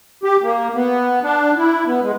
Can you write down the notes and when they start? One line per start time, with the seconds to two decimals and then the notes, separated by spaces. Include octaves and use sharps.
0.23 G4
0.43 A#3
0.75 B3
1.23 D4
1.57 E4
1.86 B3
2.02 G#3